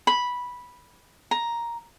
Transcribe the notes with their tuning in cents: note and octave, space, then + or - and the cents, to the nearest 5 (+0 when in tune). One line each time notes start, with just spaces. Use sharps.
B5 -10
A#5 +5